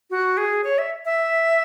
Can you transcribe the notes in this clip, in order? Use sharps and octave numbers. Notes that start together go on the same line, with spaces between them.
F#4
G#4
C#5
E5
E5